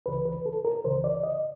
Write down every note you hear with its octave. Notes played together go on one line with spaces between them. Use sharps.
C#2 C#3 E3 B4
B4
A4
A#4
C#2 C#3 E3 C5
D5
D#5